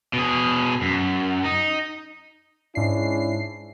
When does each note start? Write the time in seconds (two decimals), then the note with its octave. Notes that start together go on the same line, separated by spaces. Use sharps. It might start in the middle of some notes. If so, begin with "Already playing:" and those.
0.13 B2 G#4
0.82 F#2
1.44 D#4
2.75 G#2 C#4 D4 E4 C7